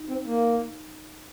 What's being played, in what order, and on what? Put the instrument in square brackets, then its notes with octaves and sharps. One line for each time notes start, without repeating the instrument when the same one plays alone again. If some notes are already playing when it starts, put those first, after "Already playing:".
Already playing: [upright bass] D#4
[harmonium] C4
A#3